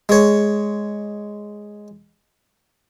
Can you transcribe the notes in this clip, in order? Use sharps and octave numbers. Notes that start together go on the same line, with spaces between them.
G#3 C#5